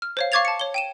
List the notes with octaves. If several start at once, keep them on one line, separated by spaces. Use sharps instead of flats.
F6
C5 C#5 F5
F5 C#6 D6 G#6 A6 F7
A5 C#7
C#5 G7
G5 D#7 E7